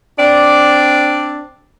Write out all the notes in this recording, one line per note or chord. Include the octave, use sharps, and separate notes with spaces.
C4 D4 D5